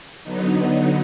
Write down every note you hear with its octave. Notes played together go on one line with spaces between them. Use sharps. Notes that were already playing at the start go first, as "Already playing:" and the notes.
D3 F#3 B3 D#4